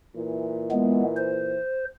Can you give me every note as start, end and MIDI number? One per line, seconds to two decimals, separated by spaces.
0.15 1.56 46
0.15 1.56 52
0.71 1.03 56
0.71 1.03 59
1.16 1.85 72